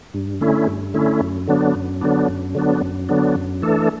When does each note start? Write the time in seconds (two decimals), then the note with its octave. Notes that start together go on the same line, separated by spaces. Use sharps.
0.14 G2
0.41 D3 A3 C#4 E4
0.67 G2
0.94 D3 A3 C#4 E4
1.21 F#2
1.48 D3 F#3 B3 D4
1.75 F#2
2.01 D3 F#3 B3 D4
2.28 F#2
2.55 D3 F#3 B3 D4
2.82 F#2
3.09 D3 F#3 B3 D4
3.36 F#2
3.62 E3 A3 D4 A4